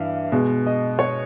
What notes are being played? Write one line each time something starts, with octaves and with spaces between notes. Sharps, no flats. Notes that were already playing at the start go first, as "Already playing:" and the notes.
Already playing: G2 E3 E5 F5
B2 G#3
D#5
C#5